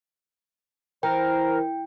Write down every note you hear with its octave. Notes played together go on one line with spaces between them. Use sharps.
E3 A#4 C5 G5